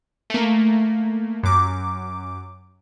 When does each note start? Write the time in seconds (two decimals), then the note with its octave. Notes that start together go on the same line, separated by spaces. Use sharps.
0.30 A3 A#3
1.43 F#2 D6